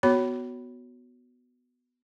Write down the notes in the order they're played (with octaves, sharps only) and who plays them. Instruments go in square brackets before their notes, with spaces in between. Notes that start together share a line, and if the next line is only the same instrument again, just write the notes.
[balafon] B3 F#4 C#5 B5